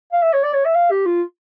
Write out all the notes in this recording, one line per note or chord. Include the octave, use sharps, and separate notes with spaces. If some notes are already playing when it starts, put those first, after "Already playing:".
F5
E5
C#5
D5
C#5
E5
F5
G4
F4